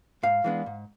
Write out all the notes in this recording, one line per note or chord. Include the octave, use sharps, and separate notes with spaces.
G#2 F5
E3 G#3 B3 D4
G#2